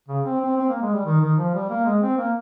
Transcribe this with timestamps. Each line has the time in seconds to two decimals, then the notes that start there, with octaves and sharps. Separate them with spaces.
0.09 C#3
0.25 C4
0.41 C4
0.57 C4
0.69 A#3
0.82 G#3
0.93 G3
1.05 D#3
1.21 D#3
1.38 F3
1.54 G3
1.70 A#3
1.86 G#3
2.02 C4
2.18 A#3